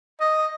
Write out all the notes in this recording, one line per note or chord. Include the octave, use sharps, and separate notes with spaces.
D#5